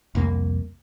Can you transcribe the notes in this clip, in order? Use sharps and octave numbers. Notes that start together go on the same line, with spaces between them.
C2 F2 A#3